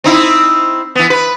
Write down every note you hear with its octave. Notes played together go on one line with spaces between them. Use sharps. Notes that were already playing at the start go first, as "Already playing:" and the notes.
C4 D#4 E4
E3 B3
B4